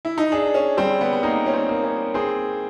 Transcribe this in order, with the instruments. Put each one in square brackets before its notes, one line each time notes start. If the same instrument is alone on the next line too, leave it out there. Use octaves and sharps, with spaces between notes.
[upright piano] E4
D#4
[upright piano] D4 [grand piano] G#4
[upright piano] C#4
[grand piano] G3 [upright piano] C4
[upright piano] B3
B3
[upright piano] A#3 [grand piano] D#4
[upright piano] C#4
C4
[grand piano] A#3
[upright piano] C#4
[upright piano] C4 [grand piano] G#4